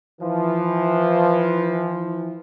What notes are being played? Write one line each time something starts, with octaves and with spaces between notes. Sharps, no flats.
E3 F3